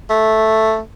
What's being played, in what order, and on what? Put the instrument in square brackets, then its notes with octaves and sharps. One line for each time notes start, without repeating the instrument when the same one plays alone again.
[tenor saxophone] A3